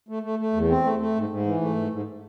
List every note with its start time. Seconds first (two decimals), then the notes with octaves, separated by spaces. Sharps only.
0.09 A3
0.23 A3
0.39 A3
0.53 E2
0.69 C4
0.84 A3
0.99 A3
1.15 G#2
1.29 G#2
1.46 E3
1.61 A3
1.75 G#2
1.90 G#2